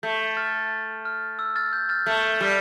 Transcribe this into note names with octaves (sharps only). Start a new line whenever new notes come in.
A3 G6
F6 A6
F6
E6
F6 A6
G6
F6 A6
A3 G6
G3